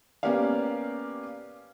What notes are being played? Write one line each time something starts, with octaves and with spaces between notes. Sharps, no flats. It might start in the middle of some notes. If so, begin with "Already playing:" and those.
A#3 B3 C#4 G4 D5 F5